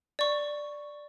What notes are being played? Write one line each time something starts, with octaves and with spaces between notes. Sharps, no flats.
D5 C#6